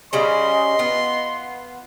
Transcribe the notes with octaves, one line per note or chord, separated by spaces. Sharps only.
C#3 G3 C#4 D#5 C6
B3 F4